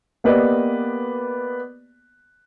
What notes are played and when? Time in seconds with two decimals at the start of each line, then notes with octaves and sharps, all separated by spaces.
0.24 A#3 B3 G4 B4 D5 D#5